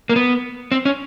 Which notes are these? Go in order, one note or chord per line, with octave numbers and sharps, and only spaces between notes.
A#3
B3
C4
C#4